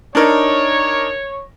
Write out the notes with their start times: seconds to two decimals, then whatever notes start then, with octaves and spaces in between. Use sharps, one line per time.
0.15 D4 D#4 A#4 C#5